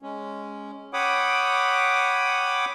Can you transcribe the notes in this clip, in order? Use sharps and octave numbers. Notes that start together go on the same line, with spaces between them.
G#3 C#4
C#5 F#5 G5 B5 D6 D#6